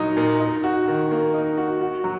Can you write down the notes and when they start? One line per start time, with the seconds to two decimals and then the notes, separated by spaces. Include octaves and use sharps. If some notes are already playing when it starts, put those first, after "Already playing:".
Already playing: A#2 F#3 D#4
0.17 A#2
0.40 D#4
0.64 F#4
0.88 D#3
1.11 A#3
1.34 D#4
1.58 F#4
1.81 F#4
2.04 F#3